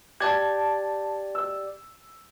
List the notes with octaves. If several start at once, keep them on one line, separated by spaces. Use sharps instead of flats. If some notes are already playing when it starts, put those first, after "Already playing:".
G4 D5 A5 G#6
E6